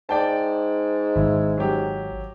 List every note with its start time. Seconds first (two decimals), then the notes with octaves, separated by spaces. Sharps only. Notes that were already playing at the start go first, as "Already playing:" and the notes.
0.09 G#2 D5 G5 A5
1.16 G#1 E4
1.57 F#3 G4